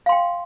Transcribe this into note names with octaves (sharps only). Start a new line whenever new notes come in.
F5 G5 C6